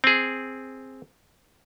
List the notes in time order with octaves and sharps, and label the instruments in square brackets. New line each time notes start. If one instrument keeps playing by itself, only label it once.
[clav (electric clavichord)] C4 G#4